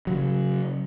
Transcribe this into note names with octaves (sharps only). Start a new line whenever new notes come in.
C#3 F#3